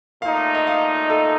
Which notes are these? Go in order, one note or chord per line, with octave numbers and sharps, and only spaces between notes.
A#2 A3 D#4 F5
D#5
F5
A4